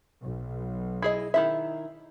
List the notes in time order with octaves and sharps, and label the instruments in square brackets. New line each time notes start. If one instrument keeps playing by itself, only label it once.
[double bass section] B1
[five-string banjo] E4 G#4 D#5
D#3 E4 E5